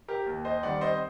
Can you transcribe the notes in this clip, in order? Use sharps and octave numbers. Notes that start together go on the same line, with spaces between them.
G4 A#4
D#2
C5 D#5
D#3 G3 C4 D5 F#5
C5 D#5